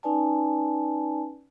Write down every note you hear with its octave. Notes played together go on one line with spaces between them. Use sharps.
C#4 D#4 B4 D5 G#5 A5